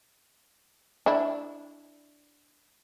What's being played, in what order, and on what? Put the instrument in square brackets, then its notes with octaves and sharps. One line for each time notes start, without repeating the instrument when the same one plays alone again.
[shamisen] D4 E4